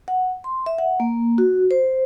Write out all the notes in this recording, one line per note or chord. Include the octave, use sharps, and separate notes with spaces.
F#5
C6
E5
F#5
A#3
F#4
C5